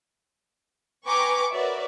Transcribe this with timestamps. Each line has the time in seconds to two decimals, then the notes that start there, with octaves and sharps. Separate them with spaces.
1.06 B4 G5 G#5 A#5 C#6 D6
1.51 F#4 A#4 B4 C#5 D5 E5